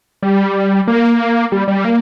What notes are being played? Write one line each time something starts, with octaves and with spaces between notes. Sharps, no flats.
G3
A#3
G3
G3
A#3